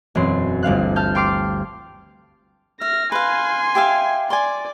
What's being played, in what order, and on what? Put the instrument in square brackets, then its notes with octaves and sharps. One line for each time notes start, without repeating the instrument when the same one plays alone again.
[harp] E1 F#2 C4 C6
G1 D2 F5 F#6
A5 F6 G6
G5 C6 D6 F6 C7
[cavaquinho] E5 [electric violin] F6 A#6
[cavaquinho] B4 F5 [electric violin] G#5 C6
[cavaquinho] G4 E5 F5
[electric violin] D5 [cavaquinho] G#5 C6